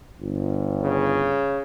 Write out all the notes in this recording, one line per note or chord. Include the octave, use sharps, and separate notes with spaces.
G1
C#3